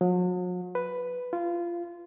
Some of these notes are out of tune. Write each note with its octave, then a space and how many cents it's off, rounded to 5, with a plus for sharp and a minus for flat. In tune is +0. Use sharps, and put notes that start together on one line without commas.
F#3 -45
B4 +5
F4 -20